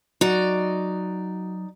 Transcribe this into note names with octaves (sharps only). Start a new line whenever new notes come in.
F#3 D#4 F#4 D5